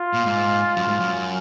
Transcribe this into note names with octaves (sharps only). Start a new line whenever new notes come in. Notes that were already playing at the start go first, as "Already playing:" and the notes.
Already playing: F4
A#2
G#2
F#2
G#2
F#2